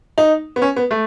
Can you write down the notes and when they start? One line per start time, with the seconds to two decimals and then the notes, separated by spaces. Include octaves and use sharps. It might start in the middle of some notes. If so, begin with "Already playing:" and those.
0.18 D#4
0.56 B3
0.62 C#4
0.76 B3
0.91 A3